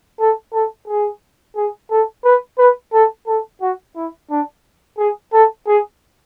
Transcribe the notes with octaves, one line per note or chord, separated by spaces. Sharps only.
A4
A4
G#4
G#4
A4
B4
B4
A4
A4
F#4
E4
D4
G#4
A4
G#4